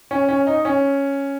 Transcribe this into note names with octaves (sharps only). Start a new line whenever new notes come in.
C#4
C#4
D#4
C#4